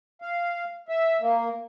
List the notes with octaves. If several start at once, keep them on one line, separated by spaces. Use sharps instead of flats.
F5
E5
A#3